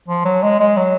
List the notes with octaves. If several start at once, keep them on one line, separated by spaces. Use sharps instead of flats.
F3
F#3
G#3
G#3
F#3